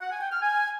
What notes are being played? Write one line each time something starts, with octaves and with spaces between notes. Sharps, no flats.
F#5
G#5
G5
F6
G#5